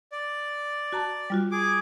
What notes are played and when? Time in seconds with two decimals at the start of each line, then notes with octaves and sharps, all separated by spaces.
0.12 D5
0.93 F#4 A5 A#5
1.30 G3 F4 F#4
1.51 G#4 D6